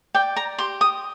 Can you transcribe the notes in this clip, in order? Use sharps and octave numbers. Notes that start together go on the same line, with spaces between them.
D5 G5
A#5
G4 C6
D#6